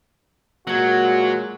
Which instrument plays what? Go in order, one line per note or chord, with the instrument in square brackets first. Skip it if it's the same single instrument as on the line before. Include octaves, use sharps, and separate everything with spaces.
[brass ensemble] A#2 G#3 A#3 [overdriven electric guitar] F#3 [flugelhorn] F#4 [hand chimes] F#6 G#6